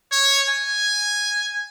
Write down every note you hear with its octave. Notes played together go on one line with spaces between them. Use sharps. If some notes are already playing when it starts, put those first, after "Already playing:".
C#5
G#5